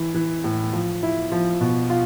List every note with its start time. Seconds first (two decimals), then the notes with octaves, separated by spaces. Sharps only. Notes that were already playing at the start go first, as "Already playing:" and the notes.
Already playing: E3
0.14 E3
0.44 A2
0.73 F3
1.03 E4
1.32 F3
1.61 B2
1.90 F4